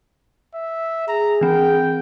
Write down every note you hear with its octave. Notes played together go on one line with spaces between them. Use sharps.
E5
G#4 A#5
E3 C4 G5